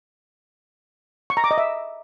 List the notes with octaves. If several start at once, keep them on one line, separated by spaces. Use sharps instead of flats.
C#6
A#5
D6
D#5
E5